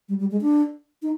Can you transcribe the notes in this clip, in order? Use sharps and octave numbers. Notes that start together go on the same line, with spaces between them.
G3
G3
G#3
D4
D#4